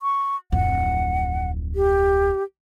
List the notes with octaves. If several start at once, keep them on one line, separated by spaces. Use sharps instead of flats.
C#6
D1 F2 F#5
G4